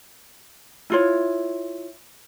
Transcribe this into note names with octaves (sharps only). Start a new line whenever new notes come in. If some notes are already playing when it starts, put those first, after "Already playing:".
E4 F4 C#5